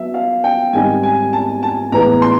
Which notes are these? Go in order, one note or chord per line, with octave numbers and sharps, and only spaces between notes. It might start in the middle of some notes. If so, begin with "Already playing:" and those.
Already playing: F#3 B3 E5
F5
G5
G#2 D#3 G3 C4 D#4 G#5
G#5
A5
A5
A2 E3 G#3 B3 A#5
C6